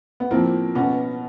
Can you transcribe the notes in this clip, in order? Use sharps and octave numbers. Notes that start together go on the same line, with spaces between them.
B3
A2 F3 A#3 C4
B2 B3 C#4